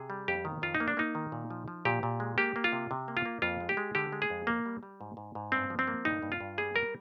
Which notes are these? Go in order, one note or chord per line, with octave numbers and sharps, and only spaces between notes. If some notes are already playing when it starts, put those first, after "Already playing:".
Already playing: C3 G#4
G3
F2 G4
D#3
F2 F4
D#4
A#3
D4
A#3 D#4
D#3
A#2
F3
F3
A#2 G4
A#2
G#3
A#3 G4
A#3
F4
C3
C3
A#3
F4
A#3
F2 F4
G#3
G4
G#3
D3 G4
G#3
G#4
F2
A#3
G3
G3
G#2
G#2
G#2
G2 C4
F3
C4
A#3
G2 D#4
G2
F4
G2
G3 G#4
G3 A#4